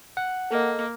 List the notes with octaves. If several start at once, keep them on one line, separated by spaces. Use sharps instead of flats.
F#5
A#3 A4 A#4 D#5